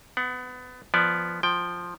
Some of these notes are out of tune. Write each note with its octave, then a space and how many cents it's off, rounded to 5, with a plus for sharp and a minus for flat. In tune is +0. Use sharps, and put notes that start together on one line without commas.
B3 +25 F#5 +0
F3 -10 B3 +0 D5 +0
F3 +5 G5 +0